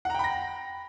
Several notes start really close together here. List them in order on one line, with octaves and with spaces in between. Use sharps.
F#5 A#5 G5 B5 A#6